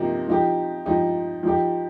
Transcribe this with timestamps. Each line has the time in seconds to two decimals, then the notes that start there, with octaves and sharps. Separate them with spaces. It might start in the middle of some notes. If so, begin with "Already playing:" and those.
Already playing: C3 F3 A#3 D#4 G4
0.28 F3 D#4 G4
0.86 F3 D#4 G4
1.43 F3 D#4 G4